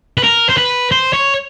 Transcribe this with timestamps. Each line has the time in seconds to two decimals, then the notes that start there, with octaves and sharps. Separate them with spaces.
0.18 B4
0.24 A#4
0.49 C5
0.57 B4
0.92 C5
1.13 C#5